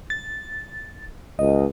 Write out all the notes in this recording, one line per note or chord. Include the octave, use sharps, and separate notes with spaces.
A6
C#2 D#5